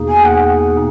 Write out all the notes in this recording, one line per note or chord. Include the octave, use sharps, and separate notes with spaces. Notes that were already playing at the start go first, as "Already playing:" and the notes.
Already playing: E2 B2 A#3 D#4 G#4
G#5
F#5